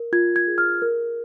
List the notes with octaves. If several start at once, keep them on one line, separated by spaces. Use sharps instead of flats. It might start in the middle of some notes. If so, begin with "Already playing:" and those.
Already playing: A#4
F4 G#6
G#6
G#4
F6
A#4